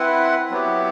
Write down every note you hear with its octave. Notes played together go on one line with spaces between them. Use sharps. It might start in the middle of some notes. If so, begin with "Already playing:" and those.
Already playing: C4 E4 B4 F#5
F#3 B3 E4 G4